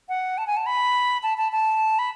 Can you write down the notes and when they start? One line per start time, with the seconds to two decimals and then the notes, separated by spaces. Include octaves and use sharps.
0.09 F#5
0.38 A5
0.47 G#5
0.57 A5
0.66 B5
1.23 A5
1.38 A5
1.52 A5
1.99 B5